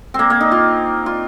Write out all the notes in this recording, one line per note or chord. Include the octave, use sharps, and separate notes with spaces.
A#3 C4
A#3
D#4
F4
F4